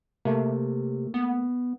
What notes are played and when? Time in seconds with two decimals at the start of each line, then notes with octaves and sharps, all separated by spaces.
0.25 C3 A3 A#3
1.14 B3